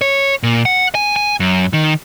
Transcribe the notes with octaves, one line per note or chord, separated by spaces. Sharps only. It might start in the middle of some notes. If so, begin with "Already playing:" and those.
C#5
A#2
F#5
G#5
G#5
F#2
D#3